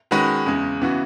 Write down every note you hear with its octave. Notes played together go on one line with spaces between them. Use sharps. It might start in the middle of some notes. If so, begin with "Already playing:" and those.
D#3 G#3 C#4 F#4 B4
E2 C#3 G#3
C#3 E3 B3 F#4